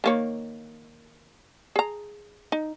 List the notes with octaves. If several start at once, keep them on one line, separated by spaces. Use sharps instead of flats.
D#3 A#3 C#5
G#4 A#5
D#4